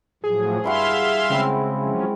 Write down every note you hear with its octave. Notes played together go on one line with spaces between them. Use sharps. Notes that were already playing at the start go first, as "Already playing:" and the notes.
A2 F3 F#3 G#4
G2 E4 F#4 E5 F5 C6
C#3 G#3 C4 E4
F3 F#3 C#4